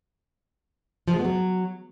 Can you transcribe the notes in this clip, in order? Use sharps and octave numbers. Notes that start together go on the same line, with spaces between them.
F3
G#3
B3
F#3